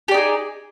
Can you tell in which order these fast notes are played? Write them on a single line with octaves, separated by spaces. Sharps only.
G4 D5 D#4 G#4